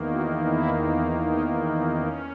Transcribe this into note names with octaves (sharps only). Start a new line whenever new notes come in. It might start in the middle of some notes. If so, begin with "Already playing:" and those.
Already playing: E2 D#3 A#3
F#4
E4
D#4
C#4